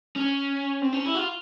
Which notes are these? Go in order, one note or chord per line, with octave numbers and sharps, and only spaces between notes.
C#4
C4
C#4
E4
F#4
F4